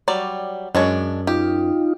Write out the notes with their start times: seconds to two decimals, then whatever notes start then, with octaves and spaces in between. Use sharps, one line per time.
0.08 F#3 G3 D5
0.75 F#2 G#3 D4 C#5
1.27 D#4 F4 G4